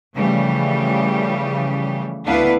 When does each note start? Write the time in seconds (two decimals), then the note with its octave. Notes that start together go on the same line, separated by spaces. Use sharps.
0.14 C#3 E3 F3 G3 A3 G4
2.25 D2 B3 D4 E4 B4 F5